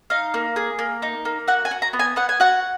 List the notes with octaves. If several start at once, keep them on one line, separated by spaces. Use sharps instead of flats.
D#4 F5
A#3
G#4
A#3
D#4
A#3
F#4 F#5
G#5
F#4
A#5
B3
G#5
B3 F#5
G#5
F#4 F#5